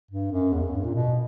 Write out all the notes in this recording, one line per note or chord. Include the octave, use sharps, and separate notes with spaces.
G2
F#2
E2
F#2
G2
A#2
B2